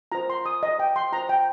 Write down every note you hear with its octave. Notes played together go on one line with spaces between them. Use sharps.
F4 C5 A#5
C6
D#6
D#5
G5
C6
F4 C5 A#5
G5